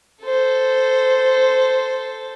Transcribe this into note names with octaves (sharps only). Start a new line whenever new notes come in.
A4 C5